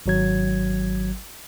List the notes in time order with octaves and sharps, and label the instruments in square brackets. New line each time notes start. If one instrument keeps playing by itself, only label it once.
[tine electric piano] G#1 F#3 G#6